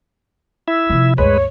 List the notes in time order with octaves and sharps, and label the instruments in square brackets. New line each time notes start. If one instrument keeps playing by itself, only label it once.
[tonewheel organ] E4 E5
[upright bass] C3 F3
[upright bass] D2 G2 [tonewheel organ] G#3 B4 [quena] C#5